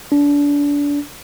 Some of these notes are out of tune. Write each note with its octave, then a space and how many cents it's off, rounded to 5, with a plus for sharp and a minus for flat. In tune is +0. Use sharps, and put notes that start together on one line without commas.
D4 -30